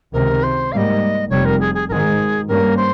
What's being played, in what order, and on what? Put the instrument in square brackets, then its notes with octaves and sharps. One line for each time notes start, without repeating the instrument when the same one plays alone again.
[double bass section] C#2 C3 D#3 [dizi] A#4
[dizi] C5
[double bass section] G#2 G3 A#3 [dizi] D#5 F5
[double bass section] F1 F2 C3 G3 [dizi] C#5
[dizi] A#4
G#4
G#4
[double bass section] G#1 G#2 D#3 G#3 [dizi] G#4 A#4
[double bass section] G2 G3 A#3 C#4 [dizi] A#4
[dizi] C5